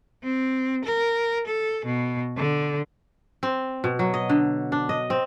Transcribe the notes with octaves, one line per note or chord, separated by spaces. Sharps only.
C4
A#4
A4
B2
D3
C4
B2
F#3
D#5
D3
D4
D#5
C4